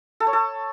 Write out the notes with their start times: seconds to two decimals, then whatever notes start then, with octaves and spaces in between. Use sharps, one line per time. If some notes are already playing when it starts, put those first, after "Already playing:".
0.20 A4
0.27 C#5
0.33 A4